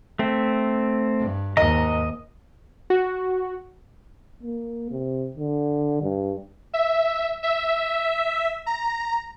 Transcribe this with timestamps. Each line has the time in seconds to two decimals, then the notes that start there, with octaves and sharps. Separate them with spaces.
0.19 A3 C4
1.19 G2
1.57 D#2 G#2 D#5 A#5
2.90 F#4
4.43 A#3
4.91 C3
5.37 D3
6.02 G2
6.74 E5
7.43 E5
8.66 A#5